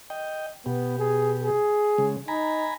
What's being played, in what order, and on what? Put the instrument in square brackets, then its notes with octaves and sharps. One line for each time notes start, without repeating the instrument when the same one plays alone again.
[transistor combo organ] D#5 G5
[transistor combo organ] B2 G4 [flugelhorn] B3
[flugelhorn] G#4
G#4
[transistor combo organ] C#3 G#3
[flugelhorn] D#4 [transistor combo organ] G#5 A#5 B5